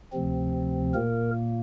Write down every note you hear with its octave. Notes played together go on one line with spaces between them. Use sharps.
D2 C3 F3 C4
A#2 A#3 A#4